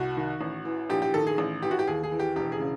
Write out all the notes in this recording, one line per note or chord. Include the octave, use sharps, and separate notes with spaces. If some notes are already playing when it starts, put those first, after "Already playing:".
Already playing: C2 F#4
D#3
A1
E3
A#1 G4
G4
D#3 A4
G#4
A1
E3 G4
F#4
G4
D#2 G#4
G#4
E3
G4
E1 G4
G#4
C#3